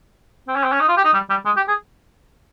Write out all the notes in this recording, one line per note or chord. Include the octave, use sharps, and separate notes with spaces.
C4
C#4
C4
C#4
D#4
F4
G4
D#4
G3
G3
G#3
G4
G#4